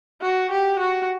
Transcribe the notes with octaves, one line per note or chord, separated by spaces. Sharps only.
F#4
G4
F#4